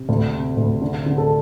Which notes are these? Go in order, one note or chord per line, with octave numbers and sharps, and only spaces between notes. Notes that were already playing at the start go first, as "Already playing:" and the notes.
Already playing: C3
D2
C3
D2
D3
D3
A4